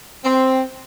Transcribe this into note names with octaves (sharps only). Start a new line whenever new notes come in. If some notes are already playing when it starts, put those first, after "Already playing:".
C4